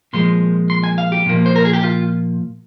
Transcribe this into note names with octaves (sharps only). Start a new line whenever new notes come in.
A#2 F3 G#3 C6
C6
G#5
F5
G4
A#2 F3 A#3
C5
A#4
G#4
G4
F4